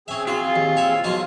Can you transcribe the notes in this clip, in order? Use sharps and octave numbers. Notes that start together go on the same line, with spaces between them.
C4 C#4 G#4 E5
F4 F#4
D#2
C#5 E5
B2 F#3 G#3 D#4 F4